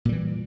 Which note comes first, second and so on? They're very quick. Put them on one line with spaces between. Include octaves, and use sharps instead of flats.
A#2 G3 E3